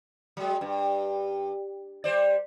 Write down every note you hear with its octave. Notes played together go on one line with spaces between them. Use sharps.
F#3 G#3
G2
G3 C5 D5